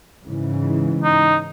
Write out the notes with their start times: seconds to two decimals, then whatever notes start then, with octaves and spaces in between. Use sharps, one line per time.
0.24 G#2 C#3 E3
1.04 D#4